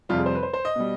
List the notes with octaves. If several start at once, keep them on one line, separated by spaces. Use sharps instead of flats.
F2 C3 G3 F4
G#4
C5
B4
C5
C5
D#5
B2 G3